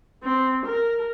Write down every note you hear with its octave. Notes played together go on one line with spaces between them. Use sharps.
C4
A#4